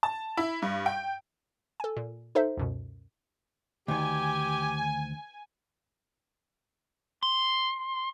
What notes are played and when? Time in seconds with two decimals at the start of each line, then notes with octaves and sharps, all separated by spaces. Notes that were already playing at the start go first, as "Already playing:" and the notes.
0.03 A5
0.37 E4
0.62 G2
0.86 G5
1.80 A4 G#5
1.97 A#2
2.35 D#4 A4 C5 E5
2.57 C#2 F#2 B2
3.88 D2 D#3 G4 G#5
7.23 C6